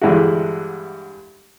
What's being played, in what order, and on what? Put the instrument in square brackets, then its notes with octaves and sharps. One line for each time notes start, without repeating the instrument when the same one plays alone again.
[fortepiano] G2 D3 E3 G#3 E4 F#4